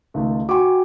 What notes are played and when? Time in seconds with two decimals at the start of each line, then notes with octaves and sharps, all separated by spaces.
0.14 C#2 D#3 A3
0.49 F#4 G5 G#5 C#6 D6